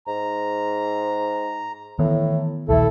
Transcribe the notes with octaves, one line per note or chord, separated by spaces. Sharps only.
G#2 A#5
A2 D#3 E3 B3
A#1 D#2 A3 E4 A4